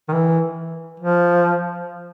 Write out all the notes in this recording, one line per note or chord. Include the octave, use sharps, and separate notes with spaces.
D#3
E3
F3